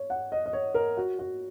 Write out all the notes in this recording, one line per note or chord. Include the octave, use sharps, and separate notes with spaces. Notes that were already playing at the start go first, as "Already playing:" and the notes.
Already playing: C#5
F#5
D#5
D#5
C#5
A#4
F#4
F#4